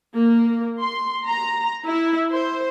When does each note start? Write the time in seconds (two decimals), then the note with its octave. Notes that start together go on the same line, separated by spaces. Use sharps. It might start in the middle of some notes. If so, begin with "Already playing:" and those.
0.13 A#3
0.80 C6
1.27 A#5
1.87 E4
2.31 C5